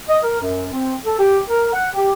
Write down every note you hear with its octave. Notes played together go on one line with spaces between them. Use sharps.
D#5
A#4
F#2
C4
A4
G4
A#4
F#5
G4